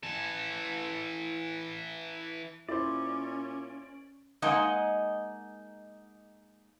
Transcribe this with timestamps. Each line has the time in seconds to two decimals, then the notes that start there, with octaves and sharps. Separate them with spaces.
0.03 E3 A4
2.69 A#2 C#4 E4 C5 D5
4.42 G#3 A#3 D#4 D#5 F#5